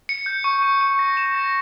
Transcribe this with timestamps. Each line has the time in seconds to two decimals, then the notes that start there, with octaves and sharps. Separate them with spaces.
0.09 C#7
0.26 G6
0.44 C#6
0.62 C#6
0.81 C#6
0.99 A#6
1.17 E7
1.35 A#6